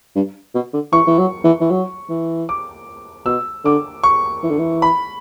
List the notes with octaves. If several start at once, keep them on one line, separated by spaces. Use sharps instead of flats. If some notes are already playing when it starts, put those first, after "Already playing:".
G2
B2
D3
E3 C#6
E3
F#3
E3
E3
F#3
E3
D6
B2 E6
D3 D6
C#6
E3
D3
E3
B5